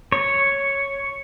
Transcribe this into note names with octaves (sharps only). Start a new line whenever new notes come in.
C#5